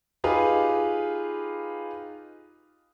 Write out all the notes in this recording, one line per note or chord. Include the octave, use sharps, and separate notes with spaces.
D#4 F4 G4 G#4 B4 F5